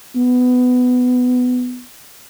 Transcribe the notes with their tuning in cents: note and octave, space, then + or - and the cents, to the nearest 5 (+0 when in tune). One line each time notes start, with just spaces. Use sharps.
B3 +15